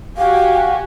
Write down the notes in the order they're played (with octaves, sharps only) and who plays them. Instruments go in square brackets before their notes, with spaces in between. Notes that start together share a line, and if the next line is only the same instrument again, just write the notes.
[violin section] F#4 G4 G#5 [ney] F5